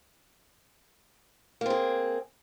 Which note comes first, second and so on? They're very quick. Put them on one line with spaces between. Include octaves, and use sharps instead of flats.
A#3 C4 G#4